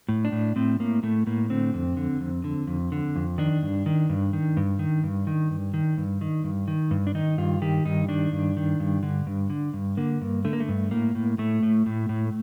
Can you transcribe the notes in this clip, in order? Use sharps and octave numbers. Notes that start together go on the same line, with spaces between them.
A2
D4
A2
A2 C4
A2 A#3
A2 A3
A2 A#3
D3 C4
F2
D3
F2
D3
F2
D3
F2
D#3 D4
G2
D#3
G2
D#3
G2
D#3
G2
D#3
G2
D#3
G2
D#3
G2
D#3
G2
D4
D#3 D#4
G2 F4
D#3 G4
G2 D#4
D#3 D4
G2
D#3
G2
D3
G2
D3
G2
D3 A#3
G2
D3 A3
A#3
A3
G2
A2 A#3
A2
A2 A3
A2
A2
A2